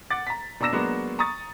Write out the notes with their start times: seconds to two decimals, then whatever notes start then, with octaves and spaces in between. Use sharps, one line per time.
0.10 F#5 D6 A6
0.27 A#5 B6
0.60 B2 D4 A#5 E6 A#6 E7
0.73 F#3 G#3 A#3 B3 D4 F#4
1.19 A#5 C#6 D#6 A6